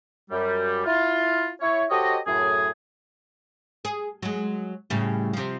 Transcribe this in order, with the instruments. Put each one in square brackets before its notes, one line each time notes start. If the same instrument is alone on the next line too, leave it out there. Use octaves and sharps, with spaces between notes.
[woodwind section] F#2 G3
E4 F4
E4 C#5
F#4 G4 A4 C5 C#5 D#5
F#2 A2 G#4
[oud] G#4
F#3 G#3
A2 C#3 G3
C3 F3